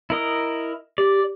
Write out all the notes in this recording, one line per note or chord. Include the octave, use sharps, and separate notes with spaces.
E4 A#4 D#5
G4 D5